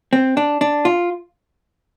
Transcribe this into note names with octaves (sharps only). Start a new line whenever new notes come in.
C4
D4
D4
F4